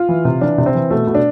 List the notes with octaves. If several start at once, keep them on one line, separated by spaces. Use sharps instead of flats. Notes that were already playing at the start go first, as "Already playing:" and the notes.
Already playing: F4
E3
C3
E3 D4
C3
C4
E3
B2 A3
B2
D4